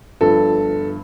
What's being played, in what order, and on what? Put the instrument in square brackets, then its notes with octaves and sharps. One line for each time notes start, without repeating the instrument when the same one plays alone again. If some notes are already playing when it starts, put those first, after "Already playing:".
[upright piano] G1 G2 F3 A4